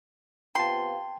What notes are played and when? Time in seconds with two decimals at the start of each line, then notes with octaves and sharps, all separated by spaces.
0.55 C3 B3 F4 G5 A5 C6